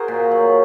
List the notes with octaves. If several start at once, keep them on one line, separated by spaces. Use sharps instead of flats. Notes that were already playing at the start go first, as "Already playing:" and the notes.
Already playing: F#4 G#4 A#4 C5
A#2
F#3